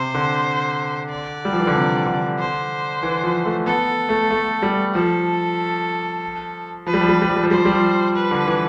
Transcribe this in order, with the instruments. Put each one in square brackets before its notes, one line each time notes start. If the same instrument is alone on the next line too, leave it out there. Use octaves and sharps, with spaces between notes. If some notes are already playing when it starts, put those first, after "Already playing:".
Already playing: [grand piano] C3 [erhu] C5
[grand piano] D3
[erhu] D5
[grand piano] G3
F3
E3
D3
C3
D3
[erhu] C5
[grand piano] E3
F3
A3
[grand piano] B3 [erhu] A4
[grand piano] A3
A3
G3
[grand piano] F3 [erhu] A4
[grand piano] F3 [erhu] B4
[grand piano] G3
F3
G3
F3
G3
F3
G3
F3
[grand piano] G3 [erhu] C5
[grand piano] F3
G3
F3
[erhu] B4
[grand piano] D3
E3